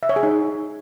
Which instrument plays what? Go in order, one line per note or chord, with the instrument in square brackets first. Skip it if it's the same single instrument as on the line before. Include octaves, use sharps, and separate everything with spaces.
[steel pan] E5
C#5
G#4
D#4